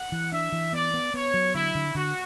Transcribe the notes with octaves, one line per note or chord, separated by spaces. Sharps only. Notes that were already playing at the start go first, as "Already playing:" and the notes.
Already playing: F#5
E3
D4 E5
E3
B3 D5
B3
B3 C#5
F#3
D3 E4
D3
D3 F#4